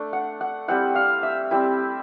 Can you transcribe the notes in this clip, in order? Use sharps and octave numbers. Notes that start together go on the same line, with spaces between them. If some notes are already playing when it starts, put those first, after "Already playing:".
Already playing: A3 D4
F#5
F#5
G3 C4 E4 F#5
F5
E5
G3 C4 E4